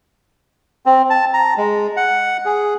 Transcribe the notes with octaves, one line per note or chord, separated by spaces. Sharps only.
C4
A5
A#5
G#3
F#5
G#4